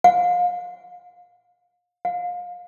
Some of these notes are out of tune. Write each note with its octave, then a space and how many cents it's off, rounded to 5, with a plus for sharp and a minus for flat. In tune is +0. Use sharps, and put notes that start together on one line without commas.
F5 +35
F5 +30